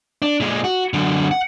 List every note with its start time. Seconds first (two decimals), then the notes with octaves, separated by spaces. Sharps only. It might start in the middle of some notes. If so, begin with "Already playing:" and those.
0.22 D4
0.40 A#2 G#3
0.64 F#4
0.94 F#2 D3
1.31 F#5